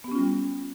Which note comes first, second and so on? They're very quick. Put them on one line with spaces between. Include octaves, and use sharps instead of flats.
B3 G4 C#4 F4 G3